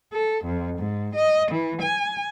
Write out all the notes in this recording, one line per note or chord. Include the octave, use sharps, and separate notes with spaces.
A4
F2
G#2
D#5
E3
G#5